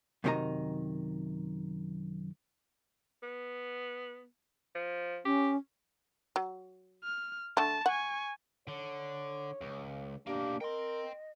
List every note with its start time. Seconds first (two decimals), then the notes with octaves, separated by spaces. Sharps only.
0.24 F#2 C3 D#3 G4 D#5 A#5
3.23 B3
4.75 F3
5.25 C#4 G4
6.36 F#3
7.04 F6
7.57 D3 A3 A5
7.86 F#5 G#5 C#6
8.68 D3 C#5
9.61 C#2
10.27 B2 A#3 D4 G4
10.61 A#4 D#5 G5 C6